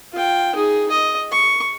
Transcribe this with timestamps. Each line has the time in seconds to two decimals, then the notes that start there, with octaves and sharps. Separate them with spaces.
0.12 F4 G5
0.55 D#4 G#4
0.91 D#5
1.32 C#6